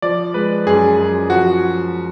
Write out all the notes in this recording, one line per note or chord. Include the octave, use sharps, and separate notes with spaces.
F3 D5
G#3 B4
F#2 G#4
F#2
F3 F#4